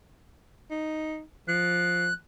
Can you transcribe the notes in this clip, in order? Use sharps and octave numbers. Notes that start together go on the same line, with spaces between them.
D#4
F3 F#6